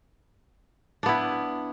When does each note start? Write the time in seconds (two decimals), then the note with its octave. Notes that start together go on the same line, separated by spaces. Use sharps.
1.03 D4
1.06 B3
1.09 E4